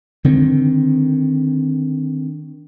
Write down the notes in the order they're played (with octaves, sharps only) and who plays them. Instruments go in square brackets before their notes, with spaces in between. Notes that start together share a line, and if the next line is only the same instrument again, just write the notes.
[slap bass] D3 D#3 C4